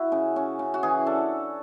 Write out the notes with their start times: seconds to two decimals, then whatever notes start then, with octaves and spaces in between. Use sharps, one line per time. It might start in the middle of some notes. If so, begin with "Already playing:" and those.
Already playing: E4 F#4
0.12 C#3
0.36 C#4
0.59 C#3
0.74 F#4
0.83 E3 G#4
1.06 D4 A4